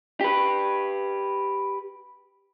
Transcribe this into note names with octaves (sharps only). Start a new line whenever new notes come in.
G4 B4